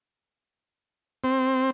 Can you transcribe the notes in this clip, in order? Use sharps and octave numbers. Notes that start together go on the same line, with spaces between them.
C4